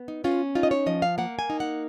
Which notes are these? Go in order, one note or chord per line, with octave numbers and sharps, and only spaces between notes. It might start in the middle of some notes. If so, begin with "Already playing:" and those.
Already playing: B3
D#4
C#4 F4
D#4 F4
D#5
C#5
F3 D#5
F5
A#3 F#5
G#5
D#4
F#5